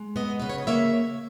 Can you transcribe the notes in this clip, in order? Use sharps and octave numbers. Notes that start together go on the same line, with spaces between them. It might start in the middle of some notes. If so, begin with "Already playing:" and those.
Already playing: G#3
B3 D#5 F#5
C#3 B4
C#5
D#5
A#3 C#5 E5